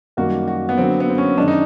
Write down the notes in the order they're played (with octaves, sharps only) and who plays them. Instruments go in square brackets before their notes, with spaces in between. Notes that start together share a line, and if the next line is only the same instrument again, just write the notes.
[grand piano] F#2 D#3 G3 A#3 [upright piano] F#4
[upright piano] F#4
B3
[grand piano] D3 F#3 A#3 [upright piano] C4
[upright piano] B3
C4
C#4
[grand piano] F#2 D#3 G#3 C#4 [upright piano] D4
[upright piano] D#4